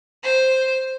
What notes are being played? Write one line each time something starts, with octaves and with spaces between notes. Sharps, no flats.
C5